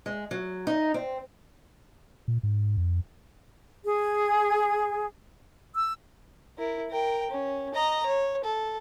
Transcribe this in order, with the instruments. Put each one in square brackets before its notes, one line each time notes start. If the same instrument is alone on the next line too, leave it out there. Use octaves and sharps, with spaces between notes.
[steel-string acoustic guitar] G#3
F#3
D#4
C4
[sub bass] A#2
G#2
F2
[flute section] G#4
E6
[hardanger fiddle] E4 A#4
A#4 G5
C#4
D#5 A#5
C#5
A4